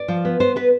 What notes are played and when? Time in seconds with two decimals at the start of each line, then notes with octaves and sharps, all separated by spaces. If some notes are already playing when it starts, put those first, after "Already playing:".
Already playing: D5
0.08 F3
0.25 B3
0.40 B3 C5
0.56 B3 B4